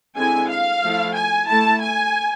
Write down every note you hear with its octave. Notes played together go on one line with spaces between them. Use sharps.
D3 G#3 C4 E4 G#5
F5
F3 A3 E4
G#5
A3 E4 A5
G#5